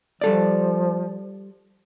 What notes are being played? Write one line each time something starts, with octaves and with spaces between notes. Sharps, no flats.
F3 G3 A4 D5